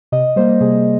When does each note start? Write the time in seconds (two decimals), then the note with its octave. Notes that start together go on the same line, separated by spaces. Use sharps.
0.12 C3 D#5
0.36 G3 A#3 C5
0.61 C3 G#4